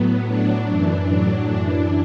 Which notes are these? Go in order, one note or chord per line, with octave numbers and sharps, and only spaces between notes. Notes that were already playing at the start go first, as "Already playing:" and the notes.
Already playing: A2 F#3 B3
A2 F#3 D4
F#2 E3
A2 F#3 D4
F#2 E3